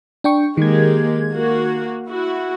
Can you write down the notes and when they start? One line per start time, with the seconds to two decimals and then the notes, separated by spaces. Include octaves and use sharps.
0.24 D4 G5 C#6
0.57 D#3 G#3 A#3 G4 G#6
1.31 A#3 F#4
2.07 E4 F#4